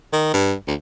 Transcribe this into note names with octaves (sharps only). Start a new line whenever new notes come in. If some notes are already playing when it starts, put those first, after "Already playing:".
D#3
G2
D2